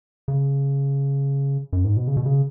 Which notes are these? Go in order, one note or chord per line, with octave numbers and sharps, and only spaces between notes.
C#3
F#2
G#2
B2
C#3
B2
C#3